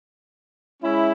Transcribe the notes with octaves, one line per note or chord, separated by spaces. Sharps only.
G#3 C#4 E4